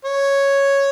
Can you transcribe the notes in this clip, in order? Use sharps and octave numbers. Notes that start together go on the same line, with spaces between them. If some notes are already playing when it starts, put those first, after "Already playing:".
C#5